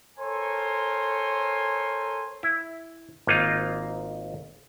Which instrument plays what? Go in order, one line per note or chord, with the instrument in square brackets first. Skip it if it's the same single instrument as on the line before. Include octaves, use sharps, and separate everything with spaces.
[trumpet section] A4 A#4 C5 C#5 G#5 C6
[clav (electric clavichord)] E4
G#1 A#3 D#4 F4